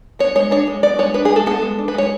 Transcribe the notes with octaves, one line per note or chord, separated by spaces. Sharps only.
B3 C#5
G#3 C#5
D4 C#5
G#3
B3 D5
G#3 C#5
D4 B4
G#4
G#3
A4
B3 A4
G#3
D4
B4
G#3 C#5